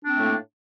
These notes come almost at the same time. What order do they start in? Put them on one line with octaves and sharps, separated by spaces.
D4 C4 A3 A2 A#3